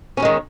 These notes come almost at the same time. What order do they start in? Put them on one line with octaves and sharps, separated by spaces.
C#4 F#3 G#3 D#3